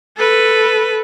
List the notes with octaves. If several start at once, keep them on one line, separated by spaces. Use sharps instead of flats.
A4 B4